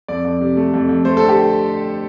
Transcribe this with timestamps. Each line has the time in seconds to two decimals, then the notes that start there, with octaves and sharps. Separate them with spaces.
0.08 F2 D5
0.25 F2
0.41 C3
0.57 A3
0.74 F2
0.89 F2
1.05 A3 C5
1.17 D3 A4
1.29 G4